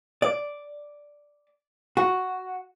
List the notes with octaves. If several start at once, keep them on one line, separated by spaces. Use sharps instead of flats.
D5
F#4